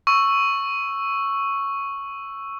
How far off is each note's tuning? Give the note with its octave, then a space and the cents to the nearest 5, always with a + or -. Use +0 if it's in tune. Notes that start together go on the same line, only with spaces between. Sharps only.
C#6 +0 E6 +5